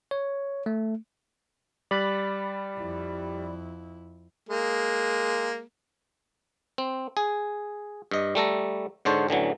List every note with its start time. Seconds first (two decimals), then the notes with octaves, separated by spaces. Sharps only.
0.11 C#5
0.66 A3
1.91 G3 D5 B5 F#6
2.76 F2 E4
4.49 G#3 A#3
6.78 C4
7.17 G#4
8.11 G2 D#5
8.35 G3 A3 A4 A#5
9.05 G#2 D3 C5 C#5 A5
9.28 A1 D3 E3 F#3